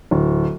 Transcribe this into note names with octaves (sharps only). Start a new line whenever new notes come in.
D1